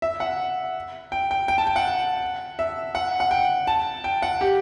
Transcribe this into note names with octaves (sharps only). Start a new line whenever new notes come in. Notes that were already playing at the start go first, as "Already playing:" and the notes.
E5
F#5
G5
G5
G5
A5
G5
F#5
E5
F#5
F#5
G5
A5
G5
F#5
G4